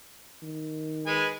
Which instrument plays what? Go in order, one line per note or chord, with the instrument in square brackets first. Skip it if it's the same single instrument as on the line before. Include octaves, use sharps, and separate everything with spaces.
[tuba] D#3
[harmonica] G#3 B4 G#5